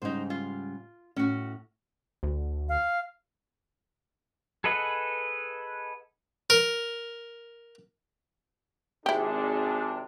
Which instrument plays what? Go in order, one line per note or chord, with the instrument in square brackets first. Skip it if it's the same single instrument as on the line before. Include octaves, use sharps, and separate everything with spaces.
[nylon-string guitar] G#2 C#3 G3 [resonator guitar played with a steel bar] D#4 C5
[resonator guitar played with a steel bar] F4
[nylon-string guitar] A2 [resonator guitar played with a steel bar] C#4 F#4
[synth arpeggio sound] D2
[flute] F5
[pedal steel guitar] G#4 A4 B4 D#5 F#5
[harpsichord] A#4
[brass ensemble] G#1 C3 D4 [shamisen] E4 G4 [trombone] G#4